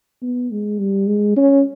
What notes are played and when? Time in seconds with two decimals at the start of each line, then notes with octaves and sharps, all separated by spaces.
0.22 B3
0.51 G#3
0.79 G3
1.08 G#3
1.36 C#4